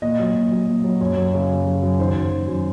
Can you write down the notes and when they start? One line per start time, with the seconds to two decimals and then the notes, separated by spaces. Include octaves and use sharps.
0.02 A#2 D#5
0.19 F#3
0.35 A#2
0.52 F#3
0.67 A#2
0.84 F#3
1.01 F#2 C#5
1.17 F#3
1.33 C#3
1.50 F#2
1.66 F#3
1.82 F#2
1.99 D#3 C5
2.15 F#2
2.32 D#3
2.48 F#2